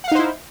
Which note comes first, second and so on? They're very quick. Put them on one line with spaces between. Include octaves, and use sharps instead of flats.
F#5 F5 D#4 C5 E4